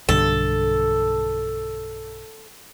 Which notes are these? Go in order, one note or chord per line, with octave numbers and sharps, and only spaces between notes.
B1 G2 D3 A4